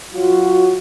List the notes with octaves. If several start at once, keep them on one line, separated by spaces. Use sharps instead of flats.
F#3 F4 F#4